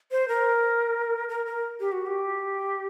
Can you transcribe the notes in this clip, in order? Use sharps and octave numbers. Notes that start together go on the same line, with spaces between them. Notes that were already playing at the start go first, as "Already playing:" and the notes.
C5
A#4
A#4
A#4
G4
F#4
G4